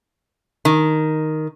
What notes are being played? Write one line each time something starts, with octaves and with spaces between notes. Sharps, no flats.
D#3